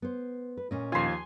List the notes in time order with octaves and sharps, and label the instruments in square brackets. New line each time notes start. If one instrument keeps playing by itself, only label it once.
[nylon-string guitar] B3 C5
B4
A#2 C#4 D#5
[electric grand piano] D#2 F3 F4 [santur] G#5 C6